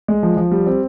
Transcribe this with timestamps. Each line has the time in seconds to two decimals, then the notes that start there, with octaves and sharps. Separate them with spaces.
0.08 G#3
0.23 F3
0.37 F3
0.52 G3
0.66 C4